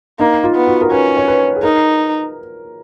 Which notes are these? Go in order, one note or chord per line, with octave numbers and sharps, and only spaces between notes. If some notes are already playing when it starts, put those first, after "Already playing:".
A#3 D#4
F4
B3
F#4
A#4
C#4 B4
C#5
B4
G#4
D#4 A#4